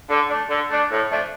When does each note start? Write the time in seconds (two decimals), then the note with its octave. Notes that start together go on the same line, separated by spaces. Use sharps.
0.09 D3
0.29 A3 D4
0.49 D3
0.70 A3 D4
0.90 A2
1.10 F3 A3 D4